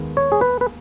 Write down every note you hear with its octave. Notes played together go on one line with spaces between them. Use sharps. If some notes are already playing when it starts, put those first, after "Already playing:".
Already playing: D#2 D#3 G#3 B3
C#5
G#4
B4
B4